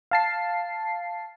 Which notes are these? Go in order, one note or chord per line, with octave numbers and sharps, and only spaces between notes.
F5 A5 C7